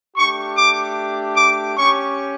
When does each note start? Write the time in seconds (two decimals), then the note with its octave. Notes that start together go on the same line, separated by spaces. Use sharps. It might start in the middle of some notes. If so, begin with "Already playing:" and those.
0.16 A3 D4 G4 C#6
0.56 D6
1.36 D6
1.77 C#4 G4 C#6